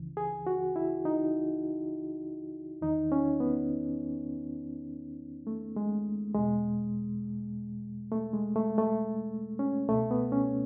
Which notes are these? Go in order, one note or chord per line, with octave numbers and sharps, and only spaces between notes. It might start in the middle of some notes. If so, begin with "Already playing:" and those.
Already playing: C#2 C#3 E3
G#4
F#4
E4
D#4
E2 D#3 D#4
C#4
B3
A3
G#3
E2 B2 G#3
A3
G#3
A3
A3
C#4
C#2 B2 A3
B3
C#4